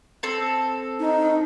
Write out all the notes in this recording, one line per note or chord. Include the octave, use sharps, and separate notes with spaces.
C4 A4
D#4